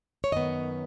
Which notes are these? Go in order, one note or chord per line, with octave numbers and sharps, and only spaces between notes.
C#5
F#2 D#3 B3 D#5